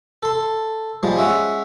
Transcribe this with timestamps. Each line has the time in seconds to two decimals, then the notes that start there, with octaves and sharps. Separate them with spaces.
0.23 A4 C6
1.03 F3 G3 G#3
1.16 G#3 C#4 E5 F#5